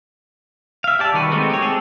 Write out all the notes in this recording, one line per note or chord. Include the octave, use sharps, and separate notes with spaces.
E5 F5
G4 D5 A5
D#3 G3 F#4 B4
G#3 A3 C4 D#4 F#4
G4 C#5
G#3 C4 G#4 A4